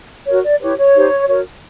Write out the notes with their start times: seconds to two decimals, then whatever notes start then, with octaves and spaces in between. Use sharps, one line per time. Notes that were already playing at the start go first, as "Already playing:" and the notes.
0.26 F#4 A#4 C#5
0.44 D5
0.60 E4 G4 B4 C#5
0.78 C#5
0.95 D#4 G4 C5
1.28 F#4 A#4 C#5